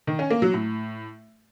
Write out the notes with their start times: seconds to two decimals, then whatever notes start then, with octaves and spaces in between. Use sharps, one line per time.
0.07 D#3
0.19 C#4
0.30 A#3
0.42 F#3
0.54 A2